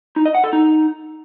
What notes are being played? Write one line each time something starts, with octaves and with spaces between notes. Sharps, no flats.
D#4
D#5
F#5
A4
D#4